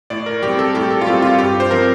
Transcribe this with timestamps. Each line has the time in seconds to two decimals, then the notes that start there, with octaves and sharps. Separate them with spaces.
0.10 A2 D5
0.26 A#4
0.42 G3 C4 G4
0.59 A4
0.74 A2 G4
0.90 A4
1.01 F4
1.06 G3 C4 G4
1.22 F4
1.39 G2 G4
1.60 C5
1.71 F3 C4 A#4